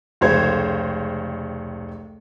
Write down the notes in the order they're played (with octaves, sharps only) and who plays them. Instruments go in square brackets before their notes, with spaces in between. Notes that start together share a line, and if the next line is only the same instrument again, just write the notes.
[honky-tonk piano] F1 C#2 C5 C#5 G#6